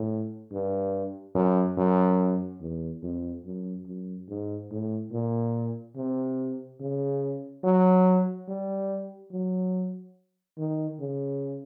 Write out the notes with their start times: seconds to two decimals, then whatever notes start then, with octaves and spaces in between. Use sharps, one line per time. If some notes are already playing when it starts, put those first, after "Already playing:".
Already playing: A2
0.52 G2
1.35 F#2
1.77 F#2
2.61 E2
3.03 F2
3.45 F#2
3.86 F#2
4.29 G#2
4.71 A2
5.13 A#2
5.96 C3
6.81 C#3
7.64 F#3
8.48 G3
9.32 F#3
10.58 D#3
11.00 C#3